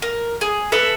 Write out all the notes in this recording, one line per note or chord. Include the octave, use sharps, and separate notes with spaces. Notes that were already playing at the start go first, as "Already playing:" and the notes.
A#4
G#4
A4 B4 E5 A5